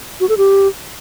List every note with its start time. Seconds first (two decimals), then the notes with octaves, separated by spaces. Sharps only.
0.20 F#4
0.29 A4
0.38 G4